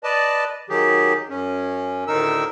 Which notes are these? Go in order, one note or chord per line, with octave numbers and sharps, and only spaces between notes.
B4 D5 D#5 A5
D#3 F#3 G4 G#4
F#2 C#4
D2 A2 D#3 D#4 A#4 E6